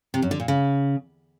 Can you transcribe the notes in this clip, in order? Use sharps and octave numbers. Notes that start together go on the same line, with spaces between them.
C3
F#2
D3
A#2
C#3